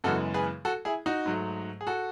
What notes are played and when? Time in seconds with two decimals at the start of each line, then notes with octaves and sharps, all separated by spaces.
0.04 F#2 C#3 E3 G#3 B3 F#4 A4
0.34 G#4 B4
0.65 F#4 A4
0.85 E4 G#4
1.06 D#4 F#4
1.26 G#2 F#3 A3
1.81 G#4
1.87 F#4 A4